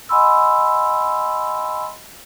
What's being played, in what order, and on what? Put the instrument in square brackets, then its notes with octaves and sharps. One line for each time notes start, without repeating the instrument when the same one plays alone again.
[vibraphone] D#5 F#5 G#5 B5 C6 E6